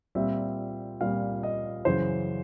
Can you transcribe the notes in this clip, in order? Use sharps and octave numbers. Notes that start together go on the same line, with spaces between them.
A#2 G3 C4 E5
A#2 G3 C4 F5
D#5
F#2 C#3 E3 C5